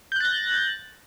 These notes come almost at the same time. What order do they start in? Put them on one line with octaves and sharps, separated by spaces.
G6 F#6 A6 A#6